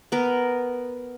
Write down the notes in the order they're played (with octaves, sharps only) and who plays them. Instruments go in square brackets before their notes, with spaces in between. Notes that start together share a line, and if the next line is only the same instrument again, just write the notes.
[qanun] B3 A#4